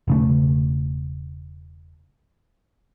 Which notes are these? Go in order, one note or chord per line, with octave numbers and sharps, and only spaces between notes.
E1 C#3 A3